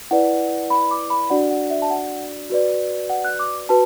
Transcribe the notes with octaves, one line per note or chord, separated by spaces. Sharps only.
E4 B4 D5 F#5
B5
D6
B5
D4 F#4 D5 F#5
F#5
E5
A5
F#5
F#4 B4 D5
F#5
F#6
D6
F#4 B4 A5